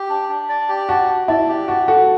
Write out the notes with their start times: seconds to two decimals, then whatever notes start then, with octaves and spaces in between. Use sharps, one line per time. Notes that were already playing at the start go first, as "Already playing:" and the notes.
Already playing: G4
0.10 D4
0.29 D4
0.49 D5
0.69 G4
0.89 D4 F#4
1.09 D4
1.28 E4 D5
1.49 G4
1.68 D4 F#4
1.88 D4 F#4 A4